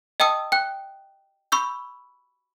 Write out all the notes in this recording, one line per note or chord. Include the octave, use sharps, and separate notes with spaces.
D#5 G5 A5 D#6 E6
G5 F#6
B5 C#6 E6 G6